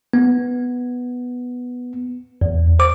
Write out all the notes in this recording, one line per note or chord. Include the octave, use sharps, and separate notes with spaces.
B3
E2
C5 D6